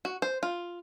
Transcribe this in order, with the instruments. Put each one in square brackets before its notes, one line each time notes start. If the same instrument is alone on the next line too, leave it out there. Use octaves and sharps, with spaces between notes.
[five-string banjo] F#4
C5
F4